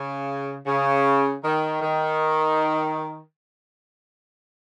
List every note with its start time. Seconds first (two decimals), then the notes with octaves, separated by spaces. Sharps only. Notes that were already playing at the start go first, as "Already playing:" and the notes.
Already playing: C#3
0.65 C#3
1.43 D#3
1.81 D#3